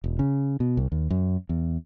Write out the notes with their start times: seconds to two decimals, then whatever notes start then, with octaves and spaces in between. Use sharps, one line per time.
0.04 E1
0.19 C#3
0.60 B2
0.77 C2
0.92 D#2
1.10 F#2
1.49 E2